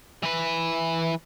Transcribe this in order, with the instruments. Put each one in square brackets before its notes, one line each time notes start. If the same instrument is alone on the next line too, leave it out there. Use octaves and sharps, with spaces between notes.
[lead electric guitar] E3 B4